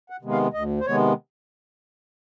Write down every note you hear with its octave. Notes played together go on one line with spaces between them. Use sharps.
F#5
C3 D#3 G#3 B3
F5
D2 D#5
C5
C3 D#3 G#3 B3 C#5